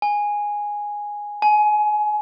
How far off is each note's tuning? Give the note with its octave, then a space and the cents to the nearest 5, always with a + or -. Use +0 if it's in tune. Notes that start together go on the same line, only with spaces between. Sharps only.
G#5 -5
G#5 +25